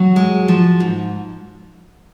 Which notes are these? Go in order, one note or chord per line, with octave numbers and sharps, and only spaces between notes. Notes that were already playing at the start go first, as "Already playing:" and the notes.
Already playing: F#3 F#4
G#3
F3
G#2